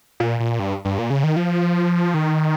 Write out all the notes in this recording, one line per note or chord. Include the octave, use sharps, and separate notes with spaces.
A#2
A#2
G2
G2
A#2
C#3
D#3
F3
D#3